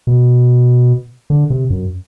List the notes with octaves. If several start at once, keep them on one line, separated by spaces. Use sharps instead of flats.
B2
D3
C3
F#2